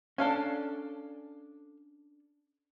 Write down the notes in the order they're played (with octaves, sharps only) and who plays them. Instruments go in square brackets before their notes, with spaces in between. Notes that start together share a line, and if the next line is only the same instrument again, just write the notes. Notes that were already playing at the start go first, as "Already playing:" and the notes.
[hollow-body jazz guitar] C#4 D4 [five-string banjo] A4 F5 G#5